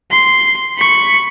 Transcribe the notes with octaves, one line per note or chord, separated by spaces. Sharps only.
C6
B5 C#6